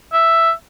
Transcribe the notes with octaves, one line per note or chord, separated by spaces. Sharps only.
E5